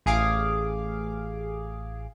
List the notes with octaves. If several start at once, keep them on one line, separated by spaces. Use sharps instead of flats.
A1 G#4 F5 D6